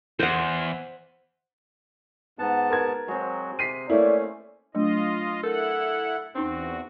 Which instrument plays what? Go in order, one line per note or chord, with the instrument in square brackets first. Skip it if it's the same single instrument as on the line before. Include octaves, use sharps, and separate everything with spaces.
[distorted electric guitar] E2 [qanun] C5 F#5
[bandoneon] G#2 B3 A5 [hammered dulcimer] F#5 A#5
[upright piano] A#4 B4 G#6
[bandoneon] F#3 F#4 [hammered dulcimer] G#3 C4
[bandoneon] C3 [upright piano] B6 C7 D#7
[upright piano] A3 A#3 E4 [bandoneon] C#4 [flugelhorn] D5
[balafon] F#3 A3 D4 [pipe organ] F4 D#5
[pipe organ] E4 F#5 [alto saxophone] A4 [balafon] A#4
[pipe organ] E2 F#4 [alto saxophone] C4 [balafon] C#4 D#4